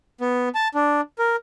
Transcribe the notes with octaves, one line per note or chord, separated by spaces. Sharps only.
B3
A5
D4
A#4